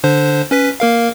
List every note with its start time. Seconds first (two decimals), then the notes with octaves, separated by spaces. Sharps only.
0.04 D3 D4 C5
0.51 C#4 B4 B6
0.80 A#3 A#4 F5